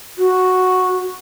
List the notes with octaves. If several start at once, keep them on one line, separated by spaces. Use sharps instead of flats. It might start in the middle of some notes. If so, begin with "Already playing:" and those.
F#4